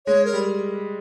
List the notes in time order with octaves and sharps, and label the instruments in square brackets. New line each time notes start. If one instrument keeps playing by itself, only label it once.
[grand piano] G#3 [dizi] C#5
[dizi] A#4
[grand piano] G3